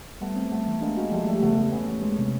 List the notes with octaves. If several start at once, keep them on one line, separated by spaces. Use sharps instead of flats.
G3 A3 B3
C4
G3 A3 B3
E3
G#3 A#3 D4
G#3 A#3 F#4
F3 G3 A3
F3 G3 A3
C#3 A3 B3
E2
E2 B3 C#4
E2
G#3
C3